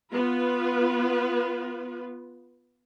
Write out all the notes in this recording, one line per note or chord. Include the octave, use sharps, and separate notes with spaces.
B3 F4 B4